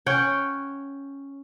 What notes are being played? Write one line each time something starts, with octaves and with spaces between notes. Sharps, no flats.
C#4 C#5 F#5 G5